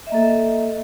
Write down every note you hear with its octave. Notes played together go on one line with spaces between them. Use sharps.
A#3 A4 D#5 E5